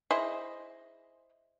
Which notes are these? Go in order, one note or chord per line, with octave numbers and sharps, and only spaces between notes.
E4 G#4 C5 D#5